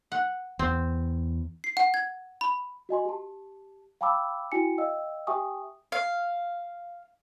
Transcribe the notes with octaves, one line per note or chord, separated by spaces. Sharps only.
F#5
E2 C4
C7
F#5
G#6
B5
F#4 D#5 G#5 C6
G4 A5
F5 G5 A5 B5 D6 E6
E4 F#4 G5 G#5 C#7
D#5 F5 G5 E6
G4 E5 G5 G#5 C#6 D#6
F5